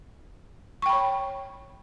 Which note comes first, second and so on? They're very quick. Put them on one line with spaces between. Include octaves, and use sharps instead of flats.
C#6 G5 B5 C#5